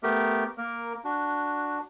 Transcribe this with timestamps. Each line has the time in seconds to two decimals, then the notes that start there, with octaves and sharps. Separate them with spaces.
0.03 A3 B3 G4 A#4
0.58 A#3 A#4
1.05 D4 F#4